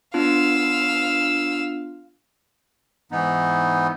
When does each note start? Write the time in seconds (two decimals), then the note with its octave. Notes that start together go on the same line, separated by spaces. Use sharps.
0.14 B3 D4 F4 F5 E6
3.12 G#2 E3 B3 D#4